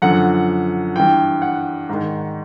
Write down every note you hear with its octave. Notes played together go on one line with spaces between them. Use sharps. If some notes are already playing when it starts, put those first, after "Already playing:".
F#2 D3 F3 F#5
G2 E3 G5
F#5
G#2 D#3